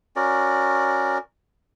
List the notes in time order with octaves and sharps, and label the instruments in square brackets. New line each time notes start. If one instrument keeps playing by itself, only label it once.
[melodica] C#4 F#4 A#4 D5